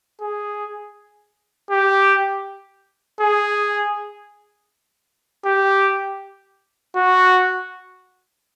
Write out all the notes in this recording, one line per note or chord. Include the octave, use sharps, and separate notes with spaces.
G#4
G4
G#4
G4
F#4